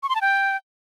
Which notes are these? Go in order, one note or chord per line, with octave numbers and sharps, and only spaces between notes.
C#6
C6
A5
G5